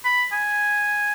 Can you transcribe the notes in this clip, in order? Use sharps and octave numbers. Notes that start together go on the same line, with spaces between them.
B5
G#5